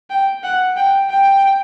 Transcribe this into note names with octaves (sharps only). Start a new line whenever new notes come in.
G5
F#5
G5
G5